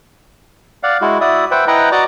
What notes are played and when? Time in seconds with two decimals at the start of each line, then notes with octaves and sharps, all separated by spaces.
0.83 D5 F5 F#5
1.01 G#3 E4 F#4
1.21 E4 F#4 D5 E5 D#6
1.51 B4 C5 E5 F#5 G5
1.68 E4 B4 D#5 F#5 G5 A#5
1.92 F#4 D5 D#5 A#5 D6